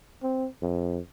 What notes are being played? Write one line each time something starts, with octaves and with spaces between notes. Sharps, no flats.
C4
F2